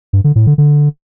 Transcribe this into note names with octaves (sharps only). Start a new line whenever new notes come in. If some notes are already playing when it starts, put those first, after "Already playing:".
G2
D3
A2
D3
D3